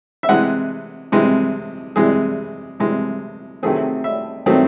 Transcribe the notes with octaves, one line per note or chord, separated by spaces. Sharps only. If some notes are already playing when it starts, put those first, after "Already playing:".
E5
C3 E3 G#3 F#5
C3 E3 G#3
C3 E3 G#3 G#4
C3 E3 G#3
C3 D#3 F#3 A3 C4 G#4
E5
C3 D#3 F#3 A3 C4